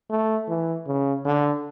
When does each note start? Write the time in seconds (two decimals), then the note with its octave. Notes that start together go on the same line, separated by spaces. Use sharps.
0.10 A3
0.48 E3
0.86 C#3
1.25 D3